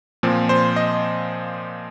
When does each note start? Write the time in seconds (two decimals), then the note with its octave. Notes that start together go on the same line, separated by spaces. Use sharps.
0.23 A#2 F3 C4
0.49 C5
0.76 D#5